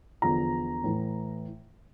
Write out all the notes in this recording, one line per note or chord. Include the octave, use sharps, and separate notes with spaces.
E2 D3 F3 A#5
A2 E3